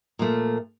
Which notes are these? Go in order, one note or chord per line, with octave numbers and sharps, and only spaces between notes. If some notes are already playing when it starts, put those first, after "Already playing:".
A#2 F3 A3